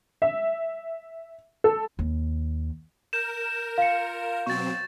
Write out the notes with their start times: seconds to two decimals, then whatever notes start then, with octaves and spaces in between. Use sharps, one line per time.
0.22 E5
1.64 A4
1.99 D#2
3.13 A#4 G6 E7
3.78 F4 F5 C#7
4.46 B2 F#3 C4 C#6 A6